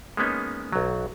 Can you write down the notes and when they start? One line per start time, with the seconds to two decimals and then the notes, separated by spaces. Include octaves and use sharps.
0.17 G#3 A#3 B3 C#4 D#4
0.73 B1 F#3